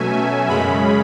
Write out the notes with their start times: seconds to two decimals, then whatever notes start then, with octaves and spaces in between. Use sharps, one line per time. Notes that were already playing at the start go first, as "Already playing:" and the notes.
Already playing: B2 F#3 A3 C#4 E5 G#5
0.48 F#2 C#3 G#3 C#4 B5